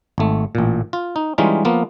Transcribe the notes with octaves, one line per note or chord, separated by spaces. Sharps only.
G#1 A3
A1 A#2
F4
D#4
E3 G3 G#3 C#4 D#4 F4
F3 A#3 B3 F4